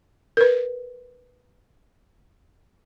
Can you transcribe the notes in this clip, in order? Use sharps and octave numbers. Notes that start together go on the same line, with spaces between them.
A#4 B4